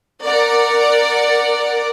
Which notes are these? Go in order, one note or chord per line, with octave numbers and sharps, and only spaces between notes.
A#4 D5 F#5